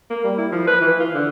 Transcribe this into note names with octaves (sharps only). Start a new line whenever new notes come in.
A#3
G3
E4
F3
B4
E3
F4
D3